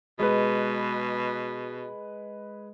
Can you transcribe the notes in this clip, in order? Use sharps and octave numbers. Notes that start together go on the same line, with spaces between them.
B2 G#3 B4